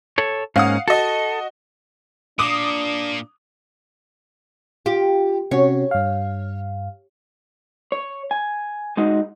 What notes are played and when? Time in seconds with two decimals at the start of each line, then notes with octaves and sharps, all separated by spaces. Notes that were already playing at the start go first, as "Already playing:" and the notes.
0.18 A4 C#5
0.56 G#2 A#3 C#4 F5 F#5 D#6
0.88 F#4 A4 D#5
2.39 A#2 A#3 D4 D6 D#6
4.86 F4 G4
5.51 C3 C#4 F#4 C#5
5.91 G2 F5
7.92 C#5
8.31 G#5
8.97 G#3 D#4 F#4